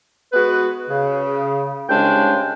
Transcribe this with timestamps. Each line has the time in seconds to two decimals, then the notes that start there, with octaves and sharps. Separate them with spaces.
0.33 G#3 B3 F#4 B4
0.90 C#3
1.89 C2 C#3 G#3 C#4 D4 G5